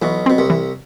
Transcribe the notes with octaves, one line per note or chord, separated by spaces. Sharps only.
B1 B2 E3
B2 C4
C2 C3
E3